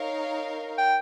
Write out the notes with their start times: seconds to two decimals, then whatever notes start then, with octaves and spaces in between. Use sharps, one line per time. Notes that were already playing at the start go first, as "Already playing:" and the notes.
Already playing: D#4 A#4 C#5 F5
0.78 G5